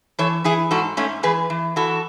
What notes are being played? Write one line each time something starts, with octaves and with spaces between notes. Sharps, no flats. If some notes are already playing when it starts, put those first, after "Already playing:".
E3 A4 C#5
E3 E4 G#4
G#2 F#4 A4
G#2 A3 C#4
E3 G#4 B4
E3
E3 F#4 A4